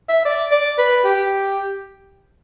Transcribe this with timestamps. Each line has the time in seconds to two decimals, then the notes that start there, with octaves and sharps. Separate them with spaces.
0.09 E5
0.25 D5
0.51 D5
0.78 B4
1.04 G4